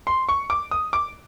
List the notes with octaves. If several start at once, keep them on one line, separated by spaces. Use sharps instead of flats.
C6
C#6
D6
D#6
D6